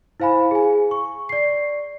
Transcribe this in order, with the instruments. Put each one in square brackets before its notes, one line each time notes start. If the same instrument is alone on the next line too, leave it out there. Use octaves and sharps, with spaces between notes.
[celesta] E4 C5 F5 G#5 B5
G#4 G#5
C#6
D5 C7